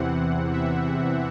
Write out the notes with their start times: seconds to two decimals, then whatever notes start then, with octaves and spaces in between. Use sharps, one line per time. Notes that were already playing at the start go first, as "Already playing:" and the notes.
Already playing: E2 C3 E3 C4 F#5
0.53 E5